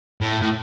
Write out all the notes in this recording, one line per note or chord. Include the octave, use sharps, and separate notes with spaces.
A2
A2